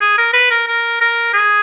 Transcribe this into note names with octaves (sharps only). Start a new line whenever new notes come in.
G#4
A#4
B4
A#4
A#4
A#4
G#4